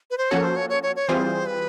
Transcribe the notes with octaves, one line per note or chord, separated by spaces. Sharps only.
B4
C5
F3 A#3 C#4 F#4 A4 C#5
C5
C#5
C#5
C#5
C#5
E3 G3 C4 F4 G#4 C5
B4